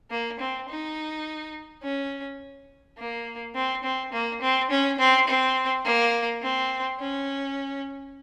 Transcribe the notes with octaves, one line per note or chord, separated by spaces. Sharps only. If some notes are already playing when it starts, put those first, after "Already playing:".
A#3
C4
D#4
C#4
A#3
C4
C4
A#3
C4
C#4
C4
C4
A#3
C4
C#4